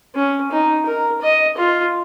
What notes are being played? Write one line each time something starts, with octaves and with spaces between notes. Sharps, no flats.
C#4
D#4
A#4
D#5
F4